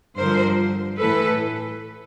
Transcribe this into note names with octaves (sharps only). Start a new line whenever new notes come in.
G2 D3 F3 A#4 C5
A2 E3 A4 B4